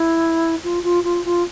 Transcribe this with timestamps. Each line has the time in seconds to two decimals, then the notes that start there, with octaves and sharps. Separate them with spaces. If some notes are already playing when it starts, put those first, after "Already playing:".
Already playing: E4
0.63 F4
0.83 F4
1.03 F4
1.24 F4